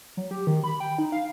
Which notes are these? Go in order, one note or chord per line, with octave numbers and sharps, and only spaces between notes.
F#3
G4
D#3
B5
G5
D#4
F5